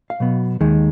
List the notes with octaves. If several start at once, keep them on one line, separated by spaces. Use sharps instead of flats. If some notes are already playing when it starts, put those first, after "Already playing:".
F5
B2 F#3 B3
D#2 D#3 G#3